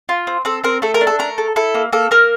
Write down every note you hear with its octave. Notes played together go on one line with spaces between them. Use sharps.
F4
C4
C4 A4
C4 A#4
A3 A4
A#4
D4
A4
A3 A#4
A4
E4 A4
A#3
A#3 A4
A#3 A#4